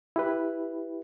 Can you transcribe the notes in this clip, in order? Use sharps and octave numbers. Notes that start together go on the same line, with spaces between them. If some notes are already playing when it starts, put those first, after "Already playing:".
E4 G4 B4